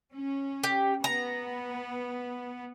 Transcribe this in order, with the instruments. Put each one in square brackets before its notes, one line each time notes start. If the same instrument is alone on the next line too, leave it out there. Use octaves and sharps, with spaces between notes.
[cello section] C#4
[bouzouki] G4
[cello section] B3 [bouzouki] A#5